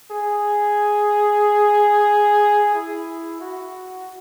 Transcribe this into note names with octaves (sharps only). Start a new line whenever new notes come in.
G#4
E4
F#4